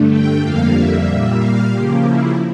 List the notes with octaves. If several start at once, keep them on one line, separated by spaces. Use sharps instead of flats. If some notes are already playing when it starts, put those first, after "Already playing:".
Already playing: G2 D3 A3
G5
F2 D3 G3 A#3 F5
E5
A#2 G3 A#3
F5
C#3 F3 A#3 G4
E4